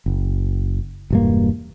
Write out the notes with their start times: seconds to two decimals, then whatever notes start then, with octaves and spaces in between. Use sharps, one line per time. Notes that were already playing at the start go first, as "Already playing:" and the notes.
0.06 F#1
1.10 E1 G2 A#3